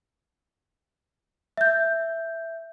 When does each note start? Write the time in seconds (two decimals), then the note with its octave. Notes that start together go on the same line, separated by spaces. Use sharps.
1.57 E5 G6